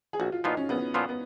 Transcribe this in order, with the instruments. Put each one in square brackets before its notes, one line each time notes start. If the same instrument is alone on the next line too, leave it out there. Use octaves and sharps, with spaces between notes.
[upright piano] G#4
[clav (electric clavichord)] A#1 [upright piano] F#4
[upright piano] F4
[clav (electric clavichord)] A#2 F3 B3 F4 [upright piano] D#4
[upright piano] C#4
[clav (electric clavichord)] A#1 [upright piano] B3
[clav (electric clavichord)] A#2 F3 B3 F4
[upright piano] B3